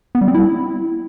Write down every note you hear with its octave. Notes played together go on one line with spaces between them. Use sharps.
B3
G3
C4
E4